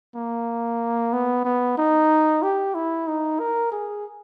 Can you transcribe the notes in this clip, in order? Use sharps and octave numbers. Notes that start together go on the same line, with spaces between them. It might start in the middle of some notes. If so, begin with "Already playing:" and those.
A#3
B3
B3
D#4
G4
E4
D#4
A#4
G#4